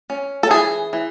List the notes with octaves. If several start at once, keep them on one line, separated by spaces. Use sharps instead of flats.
C#4
A4
E3 G#4
E3